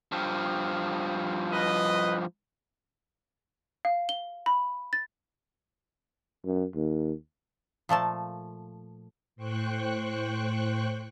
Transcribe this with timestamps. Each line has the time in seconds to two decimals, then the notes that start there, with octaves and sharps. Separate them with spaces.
0.12 G2 F3
1.52 B4 D#5
3.85 F5
4.09 G7
4.46 B5
4.93 A6
6.45 F#2
6.76 D#2
7.89 A#2 F3 A3 A5
9.36 A2 C5 G5 C#6 F#6